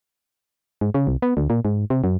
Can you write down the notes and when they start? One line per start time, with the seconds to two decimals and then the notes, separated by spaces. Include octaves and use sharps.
0.81 G#2
0.94 C#3
1.07 C2
1.22 B3
1.37 D2
1.50 A#2
1.65 G#2
1.90 C3
2.04 F#2